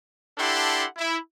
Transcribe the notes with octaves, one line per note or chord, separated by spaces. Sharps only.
D4 E4 G4 A4 F#5 C6
E4